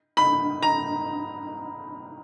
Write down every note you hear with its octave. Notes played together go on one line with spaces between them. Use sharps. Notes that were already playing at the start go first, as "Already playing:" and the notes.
B5
A#5